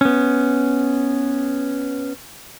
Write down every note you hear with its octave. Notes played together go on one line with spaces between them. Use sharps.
B3 C#4